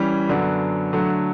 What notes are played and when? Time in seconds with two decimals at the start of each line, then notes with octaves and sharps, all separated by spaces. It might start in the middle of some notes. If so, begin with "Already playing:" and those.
Already playing: E3 G3 C#4
0.29 F#2 D3 F#3 B3 D4
0.93 D3 F#3 A3